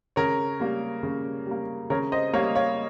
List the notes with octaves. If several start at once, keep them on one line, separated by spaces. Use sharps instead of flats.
C#3 A#4 C#5
G3 A#3
C#3
G3 A#3
C#3 A#4 C#5
C5 D#5
G3 A#3 C#5 F5
C#5 F5